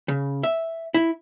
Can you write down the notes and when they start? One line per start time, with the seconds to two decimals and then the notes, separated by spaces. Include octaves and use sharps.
0.08 C#3
0.43 E5
0.94 E4